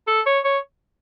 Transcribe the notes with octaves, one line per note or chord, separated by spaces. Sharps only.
A4
C#5
C#5